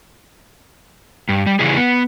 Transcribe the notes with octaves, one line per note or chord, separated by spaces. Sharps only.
G2
G3
C#3 E3 G3 G#4
B3